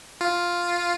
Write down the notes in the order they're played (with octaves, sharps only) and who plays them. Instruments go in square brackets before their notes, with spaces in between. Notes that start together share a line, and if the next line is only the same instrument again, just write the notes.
[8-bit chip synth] F4